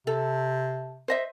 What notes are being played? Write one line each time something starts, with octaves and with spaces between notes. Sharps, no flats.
C3 A4
C5 D#5 E5